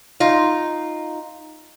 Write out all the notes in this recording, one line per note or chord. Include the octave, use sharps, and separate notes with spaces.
D#4 F4